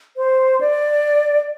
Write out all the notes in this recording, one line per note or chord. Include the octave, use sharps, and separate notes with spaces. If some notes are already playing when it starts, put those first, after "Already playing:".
C5
D5